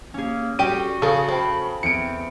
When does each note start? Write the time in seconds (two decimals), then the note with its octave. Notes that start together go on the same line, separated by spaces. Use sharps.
0.14 A#3 C#4 G#4
0.59 G3 F#4 G4 A4 D#7
1.02 C#3 G#4 A4 A5
1.28 A4 C5 G5 B5
1.83 E2 C4 C#7 D7